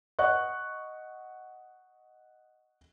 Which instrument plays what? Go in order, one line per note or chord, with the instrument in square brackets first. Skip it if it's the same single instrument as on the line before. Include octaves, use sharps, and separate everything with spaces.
[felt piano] D#5 F#5 C#6 F#6